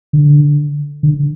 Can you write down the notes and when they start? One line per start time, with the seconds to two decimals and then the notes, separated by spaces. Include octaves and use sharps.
0.13 D3
1.03 D3